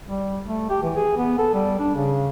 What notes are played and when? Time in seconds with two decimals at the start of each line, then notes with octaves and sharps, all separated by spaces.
0.08 G3
0.46 A3
0.70 G4
0.83 E3
0.96 G#4
1.17 B3
1.38 A4
1.54 G3
1.79 D4
1.95 C#3